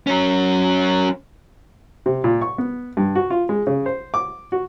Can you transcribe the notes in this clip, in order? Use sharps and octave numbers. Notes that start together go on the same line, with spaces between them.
F#3 C#4
C3
A#2
C#6
B3
G2
F#4
F4
G#3
C#3
C5
D6
F#4